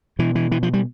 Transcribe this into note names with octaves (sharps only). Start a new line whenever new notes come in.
B2 E3
E3
E3
F3
G3